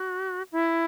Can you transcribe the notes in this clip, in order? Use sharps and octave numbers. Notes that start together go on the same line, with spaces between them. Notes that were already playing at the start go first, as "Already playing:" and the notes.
Already playing: F#4
E4